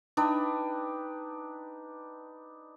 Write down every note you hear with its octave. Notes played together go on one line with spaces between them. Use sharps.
D4 D#4 B4 G5